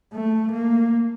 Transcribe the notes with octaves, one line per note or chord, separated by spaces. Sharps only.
A3
A#3